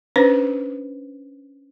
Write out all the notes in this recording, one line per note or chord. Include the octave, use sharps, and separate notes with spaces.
C#4 D4 B4 C5